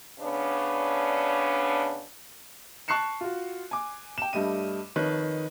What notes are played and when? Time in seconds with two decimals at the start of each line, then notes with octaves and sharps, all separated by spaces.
0.19 C#3 B3 C#4 D4
2.88 A5 C#6 F#6 C7 C#7 E7
3.21 F4 F#4
3.71 G#5 D6
4.18 G5 E7
4.33 G2 G3 A3 D#5 D#7
4.96 F2 D#3 B4 C#5